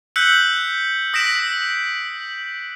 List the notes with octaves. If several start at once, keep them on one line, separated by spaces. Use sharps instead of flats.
E6 F#6 G6 B6 C#7 F#7
D#6 A#6 B6 D7 E7